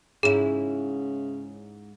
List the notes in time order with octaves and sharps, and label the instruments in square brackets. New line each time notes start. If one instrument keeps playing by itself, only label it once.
[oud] G#2 C#4 E4 [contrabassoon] C#3 [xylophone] G#4 E7